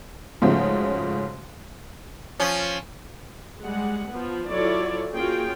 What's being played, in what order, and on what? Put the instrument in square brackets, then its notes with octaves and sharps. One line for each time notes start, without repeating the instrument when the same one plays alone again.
[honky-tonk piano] G#2 C#3 F3 A3 C#4 F#4
[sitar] F3 C#4
[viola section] G3 G#3 F#5
F3 B3
F#3 E4 F4 A4 C#5 D5
A#3 C#4 F4 F#4 G#4 G5